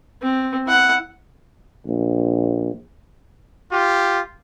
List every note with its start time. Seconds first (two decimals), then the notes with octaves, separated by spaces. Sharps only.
0.22 C4
0.67 E4 F#5
1.87 A#1
3.71 F4 G4